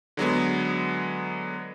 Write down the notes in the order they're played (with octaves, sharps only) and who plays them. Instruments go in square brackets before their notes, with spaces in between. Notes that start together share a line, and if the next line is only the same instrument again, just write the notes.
[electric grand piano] D3 F#3 G#3 B3